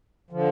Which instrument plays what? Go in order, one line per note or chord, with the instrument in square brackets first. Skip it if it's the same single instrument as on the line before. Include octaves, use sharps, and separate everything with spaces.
[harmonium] D3 F3